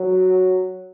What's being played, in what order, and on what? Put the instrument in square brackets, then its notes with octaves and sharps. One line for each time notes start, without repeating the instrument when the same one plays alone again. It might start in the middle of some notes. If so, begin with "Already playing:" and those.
Already playing: [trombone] F#3